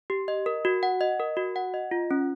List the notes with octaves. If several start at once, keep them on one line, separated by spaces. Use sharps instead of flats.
G4
D#5
A#4
F#4
F#5
D#5
A#4
F#4
F#5
D#5
F4
C#4